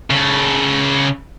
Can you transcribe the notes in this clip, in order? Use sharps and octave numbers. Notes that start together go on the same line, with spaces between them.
C#3 A4